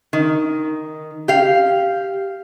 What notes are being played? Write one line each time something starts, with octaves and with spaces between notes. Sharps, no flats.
D#3
G4 F5